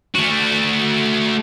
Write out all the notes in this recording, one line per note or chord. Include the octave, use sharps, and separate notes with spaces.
A3 F#4